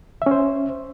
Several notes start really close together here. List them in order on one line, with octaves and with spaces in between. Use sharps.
E5 C#4 C5